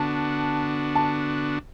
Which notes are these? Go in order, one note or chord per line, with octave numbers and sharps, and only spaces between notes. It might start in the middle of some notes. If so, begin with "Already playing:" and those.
Already playing: D3 B3 D4 F#4 A5
A5